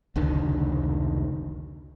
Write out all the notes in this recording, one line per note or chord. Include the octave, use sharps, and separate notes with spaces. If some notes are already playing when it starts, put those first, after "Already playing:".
F1 C#2 D3 D#3